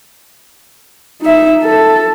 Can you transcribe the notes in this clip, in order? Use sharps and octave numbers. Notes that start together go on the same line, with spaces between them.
D#4 E5
A4